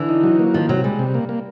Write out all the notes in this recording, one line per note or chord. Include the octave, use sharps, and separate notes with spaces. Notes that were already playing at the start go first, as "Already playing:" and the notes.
Already playing: D3 E3
D#4
F#3
A#3
D#3 F3
C3 F#3
G3 G#3
C3
A#3
A#3